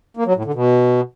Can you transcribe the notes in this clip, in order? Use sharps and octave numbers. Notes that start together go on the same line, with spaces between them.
A#3
F#3
A2
D3
B2